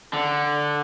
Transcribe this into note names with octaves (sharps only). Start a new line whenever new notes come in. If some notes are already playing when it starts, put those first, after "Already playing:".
D3